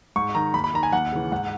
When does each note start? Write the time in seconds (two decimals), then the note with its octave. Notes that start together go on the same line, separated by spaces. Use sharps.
0.16 G#2 C#6
0.35 D#3 A#5
0.54 D#2 B5
0.64 B5
0.74 D#3 A#5
0.83 G#5
0.93 D#2 F#5
1.12 C#3 E3
1.32 G#2 F#5